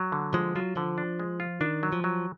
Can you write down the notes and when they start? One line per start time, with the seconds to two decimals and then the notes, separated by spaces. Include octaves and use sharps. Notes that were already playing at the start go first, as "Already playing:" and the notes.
Already playing: F#3
0.12 D3
0.34 F3 G#3
0.56 F#3 F4
0.76 D3 F3
0.98 D4
1.20 G#3
1.40 F4
1.61 D#3 D4
1.83 F#3
1.93 F3
2.04 F#3